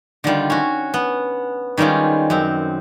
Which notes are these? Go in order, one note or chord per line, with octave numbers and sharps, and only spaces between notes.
D3 D#3 G3 F4
C#4 F#4
B3
D#3 G3 G#3 C#4 F4
F#2 C4